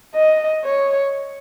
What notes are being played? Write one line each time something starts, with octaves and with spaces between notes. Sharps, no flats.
D#5
C#5